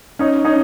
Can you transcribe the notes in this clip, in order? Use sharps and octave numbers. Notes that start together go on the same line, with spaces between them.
C#4 D#4
C#4 D#4